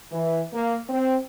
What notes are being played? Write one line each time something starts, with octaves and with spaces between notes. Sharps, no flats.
E3
A#3
C4